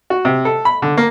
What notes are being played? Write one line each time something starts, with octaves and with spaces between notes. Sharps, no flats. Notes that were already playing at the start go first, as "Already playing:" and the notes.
F#4
C3
A4
B5
D3
A#3